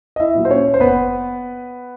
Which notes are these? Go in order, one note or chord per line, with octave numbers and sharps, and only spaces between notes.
D#5
E4 E5
A#2 F#3 A#3
C5
C#4 C#5
C5
F#1 B3 B4